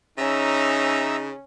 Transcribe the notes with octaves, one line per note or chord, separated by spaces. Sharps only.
C#3 C#4 D#4 E5 A#5 E6